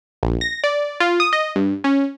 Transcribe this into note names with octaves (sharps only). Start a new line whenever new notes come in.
A#1
A#6
D5
F4
D#6
D#5
G2
C#4